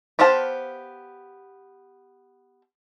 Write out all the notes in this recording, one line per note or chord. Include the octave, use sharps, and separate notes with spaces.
B3 G4 C5 F5 A5